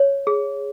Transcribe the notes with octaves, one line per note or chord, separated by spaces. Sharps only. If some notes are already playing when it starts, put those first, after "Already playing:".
Already playing: C#5
G#4